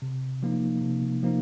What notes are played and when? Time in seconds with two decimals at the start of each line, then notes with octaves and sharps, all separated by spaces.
0.02 C3
0.43 F3 A#3 D#4
0.82 C3
1.22 F3 A#3 D#4